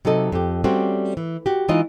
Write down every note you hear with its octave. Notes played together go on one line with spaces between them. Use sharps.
C3 F#3 D#4 A4 D#5
F2 G4
G3 A3 C4 C#4 F#4
E3
F#4 G4
E3 G#3 D#4 F4 D#5